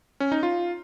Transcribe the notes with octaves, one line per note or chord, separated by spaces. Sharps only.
C#4
D#4
F4